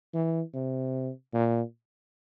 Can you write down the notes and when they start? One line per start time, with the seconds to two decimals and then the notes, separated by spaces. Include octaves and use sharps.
0.14 E3
0.54 C3
1.34 A#2